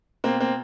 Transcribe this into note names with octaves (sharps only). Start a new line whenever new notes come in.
B2 A#3 C4
A#3 C4